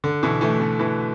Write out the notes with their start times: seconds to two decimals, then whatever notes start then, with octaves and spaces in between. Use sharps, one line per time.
0.04 D3
0.23 B2 E3
0.41 E3 A3
0.60 B2
0.79 B2 E3